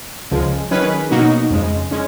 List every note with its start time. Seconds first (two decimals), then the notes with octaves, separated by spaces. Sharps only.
0.31 C#2 C#3 F3 G#3
0.71 D#3 F#3 C#4 G#4 B4
1.11 B2 F#3 A#3 D#4 F#4
1.50 F2 C#3 G#3
1.91 G#3 C#4